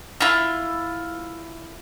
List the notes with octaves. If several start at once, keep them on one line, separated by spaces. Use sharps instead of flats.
E4 F4